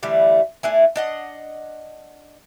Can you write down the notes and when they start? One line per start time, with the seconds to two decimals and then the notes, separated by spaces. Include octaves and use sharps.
0.03 D3 E3 G3 A3
0.63 A3 D4 E4 G#5
0.96 D4 D#5 F#5